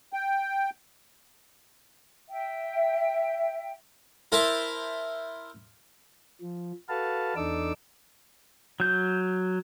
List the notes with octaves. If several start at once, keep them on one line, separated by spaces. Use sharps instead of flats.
G5
E5 G5
E4 A#4 C5 E5 A5
F3
F#4 A4 B4 F5 A5
E2 D4 D#4 A4 D6 E6
F#3 G6